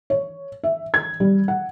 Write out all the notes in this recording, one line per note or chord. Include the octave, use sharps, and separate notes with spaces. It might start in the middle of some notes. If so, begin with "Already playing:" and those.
C#5
E5
G#6
G3
F#5